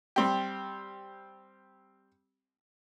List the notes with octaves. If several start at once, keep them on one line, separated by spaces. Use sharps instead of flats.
G3 C4 G4